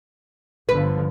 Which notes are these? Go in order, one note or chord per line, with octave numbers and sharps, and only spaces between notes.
G1 D3 F3 B4